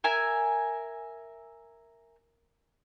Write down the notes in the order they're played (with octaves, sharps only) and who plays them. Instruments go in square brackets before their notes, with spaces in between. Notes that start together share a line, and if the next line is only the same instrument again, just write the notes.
[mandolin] A#4 E5 G#5